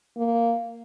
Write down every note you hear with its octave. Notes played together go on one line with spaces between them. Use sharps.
A#3